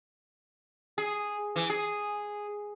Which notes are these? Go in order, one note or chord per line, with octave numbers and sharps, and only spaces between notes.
G#4
E3
G#4